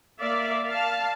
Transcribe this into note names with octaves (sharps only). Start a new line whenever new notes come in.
A#3 D5 E5 F5
F5 A5